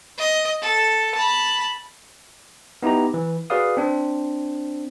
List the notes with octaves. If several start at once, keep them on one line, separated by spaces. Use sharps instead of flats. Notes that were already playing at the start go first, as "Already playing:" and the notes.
D#5
A4
A5 B5
B3 D#4 E4 G4 A#5
E3
F#4 G#4 B4 D5 F5 D#6
C4 D4